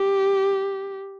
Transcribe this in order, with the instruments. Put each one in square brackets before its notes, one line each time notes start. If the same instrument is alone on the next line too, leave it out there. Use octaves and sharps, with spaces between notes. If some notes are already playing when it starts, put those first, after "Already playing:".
Already playing: [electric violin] G4